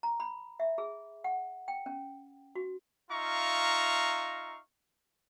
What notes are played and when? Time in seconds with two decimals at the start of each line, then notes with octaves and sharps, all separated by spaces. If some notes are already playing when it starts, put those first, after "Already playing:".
0.03 A#5
0.20 B5
0.60 E5
0.78 G#4
1.24 F#5
1.68 G5
1.86 C#4
2.55 F#4
3.10 D#4 F4 E5 F5 A#5 C#6